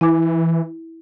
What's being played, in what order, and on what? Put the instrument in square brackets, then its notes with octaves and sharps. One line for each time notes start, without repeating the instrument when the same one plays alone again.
[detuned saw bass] E3 [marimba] E4 G#5 D6